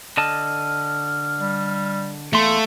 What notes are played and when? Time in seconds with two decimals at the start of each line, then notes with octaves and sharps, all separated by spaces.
0.17 D3 D#5 A5 F6
1.41 G3
2.33 E2 A3 A#3 C6